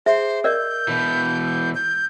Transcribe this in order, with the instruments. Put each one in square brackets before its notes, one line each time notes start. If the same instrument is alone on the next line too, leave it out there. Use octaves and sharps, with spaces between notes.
[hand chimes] G#4 [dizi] C5 [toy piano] E5
[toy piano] A#4 D5 D#5 [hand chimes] E6 [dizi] G6
[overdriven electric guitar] B2 E3
[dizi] G6